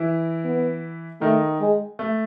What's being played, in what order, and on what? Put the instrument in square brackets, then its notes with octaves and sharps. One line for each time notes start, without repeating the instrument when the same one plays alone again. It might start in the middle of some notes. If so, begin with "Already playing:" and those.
Already playing: [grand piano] E3 E4
[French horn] B3
[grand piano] D#3 D#4 [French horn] A3
[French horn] G#3
[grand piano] A3